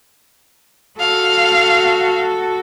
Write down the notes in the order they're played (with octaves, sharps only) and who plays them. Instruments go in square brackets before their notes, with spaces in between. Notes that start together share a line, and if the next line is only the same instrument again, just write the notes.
[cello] F#4 A4 [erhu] F5